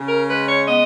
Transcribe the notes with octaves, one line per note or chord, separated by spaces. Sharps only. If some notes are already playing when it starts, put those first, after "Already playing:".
Already playing: C#3
A#4
G#3 B4
C#5
B3 D#5